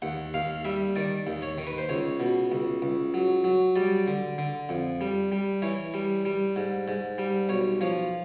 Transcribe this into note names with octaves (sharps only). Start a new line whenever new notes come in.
D#2 F#5
D#2 F5
G3 E5
D#3 D5
D#2
C#5
D#3
B4
C5
C#2 C#5
B2
C#2
C#2
F#3
F#3
G3 D5
D3
D3
F2
G3
G3
E3 C#5
G3
G3
G#2
G#2
G3
B1 C#5
F3 C#5